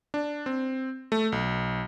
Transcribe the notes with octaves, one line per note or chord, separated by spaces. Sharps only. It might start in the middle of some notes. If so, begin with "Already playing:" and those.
D4
C4
A3
B1